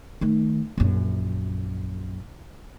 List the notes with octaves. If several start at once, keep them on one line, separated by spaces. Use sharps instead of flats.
D#3 A3
A#1 F#2